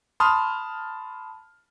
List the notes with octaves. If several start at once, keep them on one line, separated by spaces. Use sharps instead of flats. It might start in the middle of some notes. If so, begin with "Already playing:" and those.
A5 B5 C6 D#6 F6